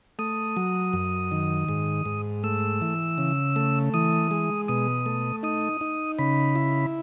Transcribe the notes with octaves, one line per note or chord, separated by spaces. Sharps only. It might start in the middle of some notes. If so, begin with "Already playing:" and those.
A3 D#6
F#3
F#2
D#3
G#2
G#2
A3 E6
E3
C#3
A3
E3 D#6
G#3
B2 D#6
A3
D#4 D#6
D#4
C#3 B5
E4